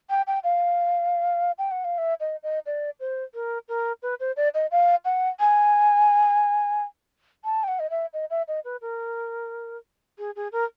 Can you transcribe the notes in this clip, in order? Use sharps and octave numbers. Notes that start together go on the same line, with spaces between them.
G5
G5
F5
G5
F#5
F5
E5
D#5
D#5
D5
C5
A#4
A#4
B4
C5
D5
D#5
F5
F#5
G#5
A5
G5
F#5
D#5
E5
D#5
E5
D#5
B4
A#4
G#4
G#4
A#4